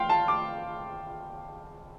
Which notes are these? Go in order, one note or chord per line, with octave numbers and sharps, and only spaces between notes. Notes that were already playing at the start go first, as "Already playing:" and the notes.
Already playing: F5 G5 C6
A5
D6